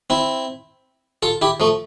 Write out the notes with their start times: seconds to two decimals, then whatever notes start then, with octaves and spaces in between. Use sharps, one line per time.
0.10 C4 E4
1.23 F4 A4
1.42 E4 G4
1.60 F3 A3